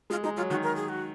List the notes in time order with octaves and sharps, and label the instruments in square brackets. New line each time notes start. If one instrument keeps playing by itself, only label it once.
[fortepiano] G#3 [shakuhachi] F4
[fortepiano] G#3 [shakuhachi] D#4
[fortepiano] F#3 [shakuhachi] F4
[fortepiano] D#3 [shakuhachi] F#4
[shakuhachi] A#4
G#4
F#4